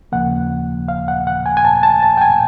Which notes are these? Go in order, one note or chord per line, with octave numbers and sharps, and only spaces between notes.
D#2 C#3 F3 A#3 F#5
F5
F#5
F#5
G#5
G#5
A5
A5
A5
G5
G#5